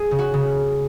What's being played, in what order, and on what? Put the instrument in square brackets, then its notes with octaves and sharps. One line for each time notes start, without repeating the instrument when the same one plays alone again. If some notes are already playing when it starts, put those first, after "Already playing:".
Already playing: [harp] G#4
C#3
F#4
C#3